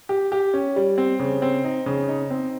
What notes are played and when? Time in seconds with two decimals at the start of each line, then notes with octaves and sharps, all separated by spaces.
0.09 G4
0.32 G4
0.54 C#4
0.76 G3
0.98 C4
1.19 C#3
1.42 C4
1.64 D#4
1.86 C#3
2.09 D#4
2.31 C4